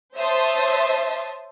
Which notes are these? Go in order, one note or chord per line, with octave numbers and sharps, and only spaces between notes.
C5 C#5 E5 A5 C6 D#6